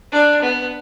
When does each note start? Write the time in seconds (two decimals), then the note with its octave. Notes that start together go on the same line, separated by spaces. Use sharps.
0.12 D4
0.42 B3